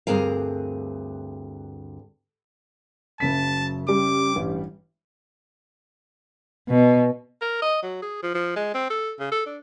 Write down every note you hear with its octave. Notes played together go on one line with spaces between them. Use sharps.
D2 G2 C4 G#4 A#4 F5
F#1 F#2 C#3 A5 B6
G3 C#4 D6
A1 G2
B2
A#4
D#5
F#3
G#4
F3
F3
G#3
C4
A4
C#3
A4
D4